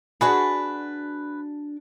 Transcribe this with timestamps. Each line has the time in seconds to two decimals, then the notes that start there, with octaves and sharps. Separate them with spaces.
0.21 D4 F#4 G#4 B4